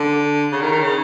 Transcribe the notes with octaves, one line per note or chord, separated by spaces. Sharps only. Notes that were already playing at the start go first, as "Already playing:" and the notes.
Already playing: D3
C#3
D#3
D#3
C#3